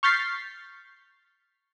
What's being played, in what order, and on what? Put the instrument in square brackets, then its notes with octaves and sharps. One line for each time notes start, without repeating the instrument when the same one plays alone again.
[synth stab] C#6 F6 G6 A6 B6 C7